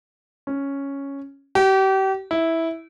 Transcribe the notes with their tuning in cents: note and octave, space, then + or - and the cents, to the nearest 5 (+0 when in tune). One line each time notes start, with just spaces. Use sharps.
C#4 +0
G4 -35
E4 -10